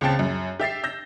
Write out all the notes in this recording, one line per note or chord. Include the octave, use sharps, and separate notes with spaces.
C#2 C#3 C4 G5 A5 A6
F#2
G4 E5 A6 C7
E6 G6 A#6